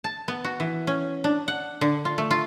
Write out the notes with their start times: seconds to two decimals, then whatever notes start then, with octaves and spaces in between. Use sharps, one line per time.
0.04 A5
0.28 B3
0.44 F#4
0.60 E3
0.87 C#4
1.24 D4
1.48 F#5
1.81 D3
2.05 F4
2.18 A3
2.31 F4